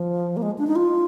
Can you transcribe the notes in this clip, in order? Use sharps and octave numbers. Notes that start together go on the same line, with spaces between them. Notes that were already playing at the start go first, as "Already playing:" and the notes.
Already playing: F3
A#3
G#3
D4
D#4
F4